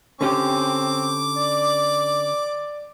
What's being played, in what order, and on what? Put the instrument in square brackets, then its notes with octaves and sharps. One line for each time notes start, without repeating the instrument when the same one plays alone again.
[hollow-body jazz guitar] D3 C#4 G4 [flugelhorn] C4 [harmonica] D6
[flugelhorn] D5